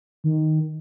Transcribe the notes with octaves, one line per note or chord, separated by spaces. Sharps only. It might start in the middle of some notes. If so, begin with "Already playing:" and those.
D#3